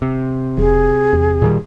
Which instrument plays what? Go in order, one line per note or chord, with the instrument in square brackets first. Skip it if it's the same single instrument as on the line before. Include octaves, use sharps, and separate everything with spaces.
[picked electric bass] C3
[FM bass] E1 [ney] G#4
[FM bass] E2
[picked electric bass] A#2 D#3 G3